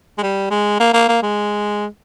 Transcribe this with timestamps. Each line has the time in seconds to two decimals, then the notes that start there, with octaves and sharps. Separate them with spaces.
0.18 G#3
0.23 G3
0.51 G#3
0.79 A#3
0.93 A#3
1.08 A#3
1.22 G#3